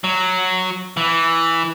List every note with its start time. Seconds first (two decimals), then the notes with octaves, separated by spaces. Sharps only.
0.04 F#3
0.97 E3